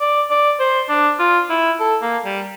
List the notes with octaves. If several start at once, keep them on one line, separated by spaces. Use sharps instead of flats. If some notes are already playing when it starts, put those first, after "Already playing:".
D5
D5
C5
D4
F4
E4
A4
A#3
G3